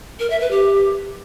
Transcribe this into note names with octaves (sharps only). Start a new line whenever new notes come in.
A#4
E5
B4
G4